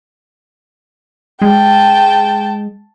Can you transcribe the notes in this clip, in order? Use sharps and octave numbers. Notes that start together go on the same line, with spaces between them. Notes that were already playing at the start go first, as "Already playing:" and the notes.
G#3 G5 A5